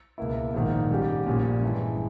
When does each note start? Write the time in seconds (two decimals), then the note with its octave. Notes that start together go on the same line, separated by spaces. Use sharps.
0.18 C#2 B2 A#3 E4
0.54 A#1 G#2 D#3
0.89 G#2 G3 C#4 G4
1.26 A#1 A#2 G3 C#4
1.63 G2 E3 G#3